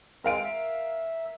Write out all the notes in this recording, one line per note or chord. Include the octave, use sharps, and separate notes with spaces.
G#3 C4 A#4 F5 D7
E5